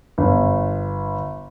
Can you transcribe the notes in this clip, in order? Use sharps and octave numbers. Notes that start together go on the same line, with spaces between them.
G1